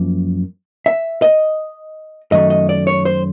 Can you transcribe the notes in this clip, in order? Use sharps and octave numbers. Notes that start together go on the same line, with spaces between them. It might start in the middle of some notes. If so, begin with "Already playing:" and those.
Already playing: F#2 F3 A#3
E5
D#5
F#2 D#3 F#3 A3 D#5
D#5
D5
C#5
C5